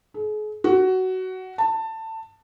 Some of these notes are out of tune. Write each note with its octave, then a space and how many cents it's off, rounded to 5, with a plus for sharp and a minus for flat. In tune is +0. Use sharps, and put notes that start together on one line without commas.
G#4 +40
F#4 +15
A5 +20